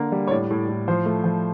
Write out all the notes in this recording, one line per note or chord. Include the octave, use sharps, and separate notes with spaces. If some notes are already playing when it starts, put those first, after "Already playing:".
Already playing: D3 A#3
G3
C#5
A2 D5
A2
A2
F3 C5
A3
F3